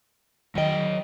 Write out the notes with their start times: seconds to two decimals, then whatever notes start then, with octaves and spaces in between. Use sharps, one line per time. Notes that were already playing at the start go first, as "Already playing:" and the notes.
0.55 D#3 F#3 D#5 G5